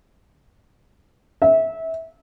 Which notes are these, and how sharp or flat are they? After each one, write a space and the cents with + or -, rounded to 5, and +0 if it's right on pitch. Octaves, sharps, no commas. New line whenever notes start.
E5 -25